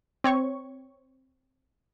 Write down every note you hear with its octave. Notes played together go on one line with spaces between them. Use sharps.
C4 C#5 C#6